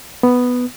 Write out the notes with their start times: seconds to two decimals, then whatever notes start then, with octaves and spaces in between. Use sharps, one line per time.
0.23 B3